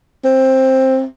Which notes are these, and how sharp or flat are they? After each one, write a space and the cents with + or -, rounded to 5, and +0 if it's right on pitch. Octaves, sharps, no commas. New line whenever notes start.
C4 +10